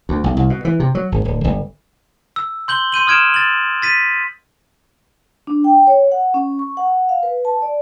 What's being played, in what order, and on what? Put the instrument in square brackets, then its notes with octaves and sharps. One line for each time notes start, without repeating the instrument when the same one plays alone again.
[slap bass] D2
B1
C2
B2
E3
C3
F#3
G#1
D1
G1
[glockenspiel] E6
C6 G6 F#7 G7
C6 G6 D#7 F#7
D#6 F6 G#6 D7 E7
A6 F#7
A6 B6 D#7
[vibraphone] D4
G5
C#5
F#5
C#4
C#6
F#5
F5
B4
A5
D5